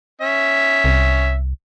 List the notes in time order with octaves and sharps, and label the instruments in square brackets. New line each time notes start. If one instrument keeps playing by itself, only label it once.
[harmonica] C#4 E5
[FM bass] C2